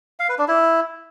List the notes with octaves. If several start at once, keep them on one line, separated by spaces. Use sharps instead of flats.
F5
B4
D4
E4